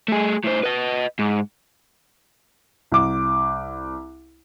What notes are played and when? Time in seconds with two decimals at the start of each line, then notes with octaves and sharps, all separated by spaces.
0.08 A3 G#4
0.44 A2 C5
0.64 B4 D#5
1.19 G#2
2.92 C2 D6